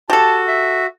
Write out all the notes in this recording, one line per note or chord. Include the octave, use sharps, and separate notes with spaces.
F#4 G4 A4 A5
E5